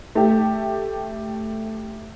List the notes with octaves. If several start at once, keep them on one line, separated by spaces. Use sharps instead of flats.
A3 G4